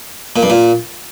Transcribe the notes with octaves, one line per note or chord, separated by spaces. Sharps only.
A#2
G2
A#2